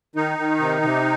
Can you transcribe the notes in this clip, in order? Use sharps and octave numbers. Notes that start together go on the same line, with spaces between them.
D#3 D#4
D#3
C3
C3